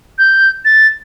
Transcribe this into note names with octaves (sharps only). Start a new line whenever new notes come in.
G6
A6